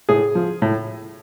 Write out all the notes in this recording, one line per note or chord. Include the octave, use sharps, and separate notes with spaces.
A2 G#4
F3
A2